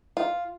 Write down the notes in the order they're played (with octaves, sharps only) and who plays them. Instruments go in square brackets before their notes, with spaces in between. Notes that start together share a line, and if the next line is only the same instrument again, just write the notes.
[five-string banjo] F4